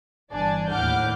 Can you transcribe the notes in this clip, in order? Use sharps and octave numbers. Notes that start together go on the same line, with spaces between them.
G1 E3 D4 D5 G#5 A5
D#2 A2 F#5 D6 F6 G6